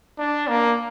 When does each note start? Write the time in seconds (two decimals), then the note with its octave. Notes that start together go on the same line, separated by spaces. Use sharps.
0.18 D4
0.48 A#3